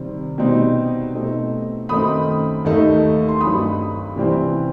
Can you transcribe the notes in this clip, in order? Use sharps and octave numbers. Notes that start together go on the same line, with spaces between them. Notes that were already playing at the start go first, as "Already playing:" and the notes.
Already playing: C3 D#3 G3 C4
B2 G3 C4 D#4
B2 A3 C4 D#4
F#2 D#3 A3 C4 D#4 B5 D#6
D#2 D#3 A3 D#4
C6
G2 F#3 C4 D#4 B5 D#6
C3 E3 G3 C4